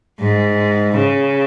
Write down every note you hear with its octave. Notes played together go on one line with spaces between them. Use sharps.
G#2
C#3